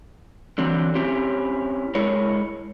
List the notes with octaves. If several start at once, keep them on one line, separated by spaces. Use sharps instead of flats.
D3 E3 F#3 C4
C4 C#4 E4 G4
G#3 E4 G#4 A#4 C#5